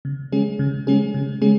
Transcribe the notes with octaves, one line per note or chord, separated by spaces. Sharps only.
C#3
G#3 C#4 G#4
C#3
G#3 C#4 G#4
C#3
G#3 C#4 G#4